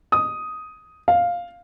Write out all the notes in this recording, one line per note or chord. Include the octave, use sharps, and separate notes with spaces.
D#6
F5